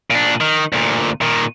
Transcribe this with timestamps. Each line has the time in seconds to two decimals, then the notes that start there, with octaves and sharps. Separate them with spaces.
0.10 A#2 D4
0.41 D#3
0.72 D2 A#2
1.21 A#2 D#3